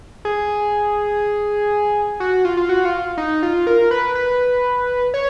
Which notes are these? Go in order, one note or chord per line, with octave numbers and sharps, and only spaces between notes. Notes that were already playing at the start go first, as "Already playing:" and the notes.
G#4
F#4
F4
F4
F#4
F4
D#4
F4
A#4
B4
B4
C#5